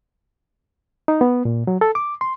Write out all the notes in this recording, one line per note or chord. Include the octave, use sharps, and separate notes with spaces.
D#4
B3
A#2
F#3
A4
D6
C6